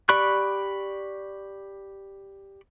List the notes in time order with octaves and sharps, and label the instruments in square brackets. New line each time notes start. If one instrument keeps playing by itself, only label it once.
[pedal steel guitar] G4 D5 B5 C#6 F#6